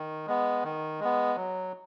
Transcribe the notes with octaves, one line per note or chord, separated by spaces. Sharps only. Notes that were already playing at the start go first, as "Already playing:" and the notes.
Already playing: D#3
G#3 B3
D#3
G#3 B3
F#3